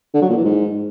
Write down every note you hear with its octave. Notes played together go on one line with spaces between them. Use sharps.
D3
F#3
A#2
E3
G#2